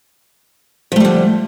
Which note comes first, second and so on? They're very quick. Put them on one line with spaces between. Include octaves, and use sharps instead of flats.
F3 A3 G3 D3